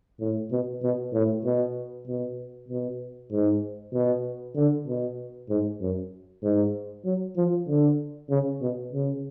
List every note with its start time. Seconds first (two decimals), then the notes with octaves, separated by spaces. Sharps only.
0.20 A2
0.51 B2
0.83 B2
1.13 A2
1.45 B2
2.08 B2
2.69 B2
3.31 G#2
3.94 B2
4.56 D3
4.88 B2
5.49 G#2
5.81 F#2
6.43 G#2
7.05 F#3
7.37 F3
7.68 D3
8.30 C#3
8.62 B2
8.93 C#3